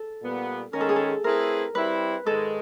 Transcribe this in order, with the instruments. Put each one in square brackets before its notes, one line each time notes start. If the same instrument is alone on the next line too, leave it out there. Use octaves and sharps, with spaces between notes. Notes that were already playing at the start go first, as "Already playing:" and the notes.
Already playing: [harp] A4
[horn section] A#2 G3 B3
[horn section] D#3 G#3 C#4 [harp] A#4
[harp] A4
G#4
A4
[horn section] A3 C4 E4 G#4 B4 [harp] A#4
[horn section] G3 C4 E4 [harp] B4
[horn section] G#2 D#3 G#3 [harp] A4